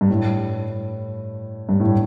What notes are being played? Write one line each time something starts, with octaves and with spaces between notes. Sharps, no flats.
G2
A2
G2
A2